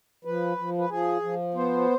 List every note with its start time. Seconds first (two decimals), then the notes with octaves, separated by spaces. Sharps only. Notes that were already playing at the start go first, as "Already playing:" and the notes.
0.25 F3 B4
0.57 F3
0.78 B4
0.89 F3 G#4
1.22 F3
1.54 B3 C5